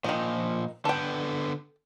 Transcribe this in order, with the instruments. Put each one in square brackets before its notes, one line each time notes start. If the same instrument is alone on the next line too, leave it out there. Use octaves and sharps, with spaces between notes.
[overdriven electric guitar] A#2 F3 [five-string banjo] D#3 D#4
[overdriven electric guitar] D3 B3 [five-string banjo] A4 G5